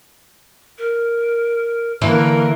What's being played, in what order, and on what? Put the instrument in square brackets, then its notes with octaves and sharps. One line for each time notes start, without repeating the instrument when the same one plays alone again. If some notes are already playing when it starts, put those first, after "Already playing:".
[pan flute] A#4
[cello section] D3 A#4 [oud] E3 [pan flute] A#3